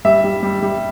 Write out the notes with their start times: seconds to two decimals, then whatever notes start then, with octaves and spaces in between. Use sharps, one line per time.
0.05 G3 E5
0.24 G3
0.43 G3
0.62 G3